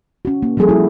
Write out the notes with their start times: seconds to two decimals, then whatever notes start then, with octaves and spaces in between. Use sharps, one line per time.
0.25 C#4 F#4
0.43 A#3
0.57 F3 G3 A#3 G#4 A4
0.69 E4 F#4